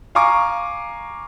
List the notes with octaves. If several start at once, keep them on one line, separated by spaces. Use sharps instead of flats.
F5 G#5 A#5 C#6 D6